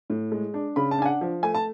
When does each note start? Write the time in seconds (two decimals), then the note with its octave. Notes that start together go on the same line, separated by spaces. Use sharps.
0.10 A2
0.32 G#3
0.54 D4
0.76 C#3 B5
0.91 A5
0.98 D4 G#5
1.06 F#5
1.21 F3
1.43 A3 G#5
1.54 A5